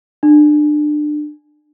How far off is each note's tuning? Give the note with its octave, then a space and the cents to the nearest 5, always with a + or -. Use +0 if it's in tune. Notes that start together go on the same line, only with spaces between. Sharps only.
D4 +25